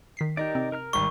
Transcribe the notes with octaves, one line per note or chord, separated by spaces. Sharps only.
D#3 B6 C7
D#4 G4 A#4 D5
C3 C4
A#4 A#5 F6
G#1 G3 C#6